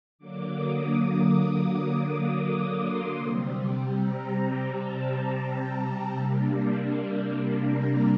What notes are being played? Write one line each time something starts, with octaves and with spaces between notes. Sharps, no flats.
D3 F#3 A#3 D6
D#6
D#6
D#6
D6
C6
C3 G3 C4
A#5
A5
C3 G3 A#3 D4
A#5